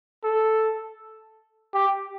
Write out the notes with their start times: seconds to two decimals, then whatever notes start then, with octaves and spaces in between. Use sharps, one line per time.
0.24 A4
1.74 G4